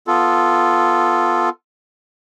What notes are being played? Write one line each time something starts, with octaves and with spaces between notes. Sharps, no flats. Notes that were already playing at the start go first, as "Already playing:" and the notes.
B3 F4 A4